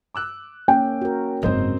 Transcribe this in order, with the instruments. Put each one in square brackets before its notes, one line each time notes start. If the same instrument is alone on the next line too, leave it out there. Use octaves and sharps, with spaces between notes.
[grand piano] D6 E6 F#6
[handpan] A#3 C#4 [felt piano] G5
[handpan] F#4 A#4
[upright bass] F#1 G#2 [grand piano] C4 C5 D#5